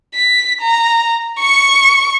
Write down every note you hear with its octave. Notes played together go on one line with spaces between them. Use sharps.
B6
A#5
C#6 C#7